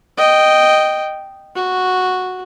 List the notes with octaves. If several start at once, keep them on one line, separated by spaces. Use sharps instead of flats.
D#5 G5
F#4